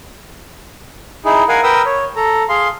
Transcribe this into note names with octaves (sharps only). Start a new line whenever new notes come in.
D#4 E4 G#4
A#4 F5 F#5 G#5
A#4 B4 G5 D#6 E6
C#5
A4 A#5
G#4 F5 C6